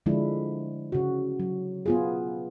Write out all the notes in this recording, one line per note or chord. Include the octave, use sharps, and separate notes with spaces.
D3 F3 G#3 D4 E4
C#3 F#4
F#3
B3 F4 G#4